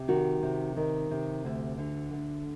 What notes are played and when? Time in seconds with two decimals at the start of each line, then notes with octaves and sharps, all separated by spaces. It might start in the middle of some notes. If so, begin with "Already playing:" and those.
Already playing: C3
0.08 D#3 F#4
0.43 C3
0.76 D#3
1.11 C3
1.45 D2
1.78 D3
2.13 D2